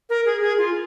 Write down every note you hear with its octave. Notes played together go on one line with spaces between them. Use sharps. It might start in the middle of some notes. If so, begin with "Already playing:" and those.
A#4
G#4
G#4
F4